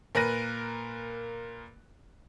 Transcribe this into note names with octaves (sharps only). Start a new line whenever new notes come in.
A#2 A#4 B4 F#6 A#6 D#7